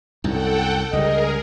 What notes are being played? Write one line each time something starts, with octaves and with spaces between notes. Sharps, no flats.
C2 F#2 A4 F#5 G5
C#2 G3 G#4 A#4 D#5